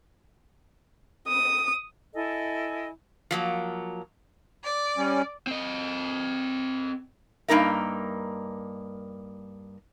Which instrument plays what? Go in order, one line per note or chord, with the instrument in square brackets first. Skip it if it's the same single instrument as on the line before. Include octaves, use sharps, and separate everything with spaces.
[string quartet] D#6
[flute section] E4 A4 D#5 G#5
[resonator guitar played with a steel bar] F3 F#3 A#3
[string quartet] D5
[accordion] G3 C#4
[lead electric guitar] C4 D#5
[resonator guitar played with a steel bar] G2 A#3 D#4 A#4 E5